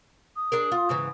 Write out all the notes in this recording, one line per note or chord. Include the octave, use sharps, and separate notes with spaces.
D#6
D4 G#4 A#4
F4
G#2 C#3 E3